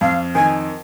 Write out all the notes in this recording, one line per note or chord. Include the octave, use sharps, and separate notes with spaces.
F2 F5
D#3 G#5